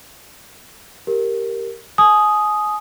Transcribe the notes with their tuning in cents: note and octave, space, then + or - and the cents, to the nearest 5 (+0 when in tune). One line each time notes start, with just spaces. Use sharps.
G4 +0 A#4 -5
G#5 +30 D#6 +0